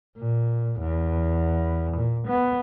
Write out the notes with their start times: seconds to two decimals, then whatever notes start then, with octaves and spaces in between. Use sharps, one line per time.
0.17 A#2
0.80 E2
1.97 A#2
2.27 B3